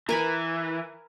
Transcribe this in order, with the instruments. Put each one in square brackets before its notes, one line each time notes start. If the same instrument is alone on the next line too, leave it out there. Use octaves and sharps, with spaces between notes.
[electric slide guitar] E3 [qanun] A#4 G#5 B5